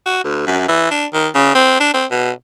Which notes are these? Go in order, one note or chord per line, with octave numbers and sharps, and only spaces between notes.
F#4
D2
F#2
E3
D4
D#3
C#3
C4
D4
C4
B2